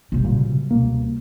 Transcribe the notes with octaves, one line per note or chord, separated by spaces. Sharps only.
C3 G3
A#2 C#3 F#3
C#2 B2 A#3